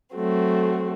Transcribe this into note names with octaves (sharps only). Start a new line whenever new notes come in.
F#3 A3 C4 F#4